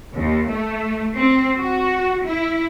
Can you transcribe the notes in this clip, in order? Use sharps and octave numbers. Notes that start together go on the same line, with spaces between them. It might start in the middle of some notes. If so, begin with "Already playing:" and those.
D#2
A3
C4
F#4
E4